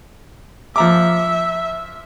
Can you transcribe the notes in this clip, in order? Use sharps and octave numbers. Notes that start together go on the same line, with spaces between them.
F3 E5 A#5 D6